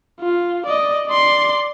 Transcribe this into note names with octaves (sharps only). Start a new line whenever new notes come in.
F4
D5 D#5
D5 C6